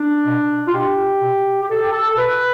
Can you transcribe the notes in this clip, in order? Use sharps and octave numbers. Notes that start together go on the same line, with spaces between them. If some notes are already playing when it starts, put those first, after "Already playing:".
Already playing: D4
B2
F4
B2 G4
B2
G4
B2 A4
G4
A4
A4
B2 B4